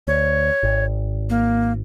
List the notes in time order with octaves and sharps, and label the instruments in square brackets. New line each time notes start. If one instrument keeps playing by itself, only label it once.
[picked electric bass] D2 [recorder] C#5
[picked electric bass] G#1
[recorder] A#3